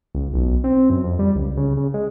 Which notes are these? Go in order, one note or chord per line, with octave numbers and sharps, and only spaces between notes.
C#2
B1
C4
F#2
F2
G3
C#2
C#3
C#3
G#3